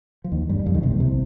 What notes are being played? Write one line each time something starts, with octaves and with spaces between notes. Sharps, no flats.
F3
D#2 D#3
G2 G3
G3
F2 F3
D#2 D#3
C2 C3
A#1 A#2
C2 C3